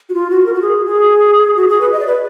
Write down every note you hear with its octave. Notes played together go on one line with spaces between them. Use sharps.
F#4
F4
F#4
A#4
F#4
G#4
G#4
F#4
G#4
B4
D#5
D5
B4